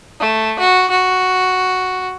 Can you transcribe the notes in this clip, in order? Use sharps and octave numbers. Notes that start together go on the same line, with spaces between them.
A3
F#4
F#4